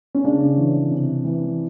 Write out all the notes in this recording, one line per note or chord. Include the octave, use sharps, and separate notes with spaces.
C#4
C#3 D4
E3
C3
E3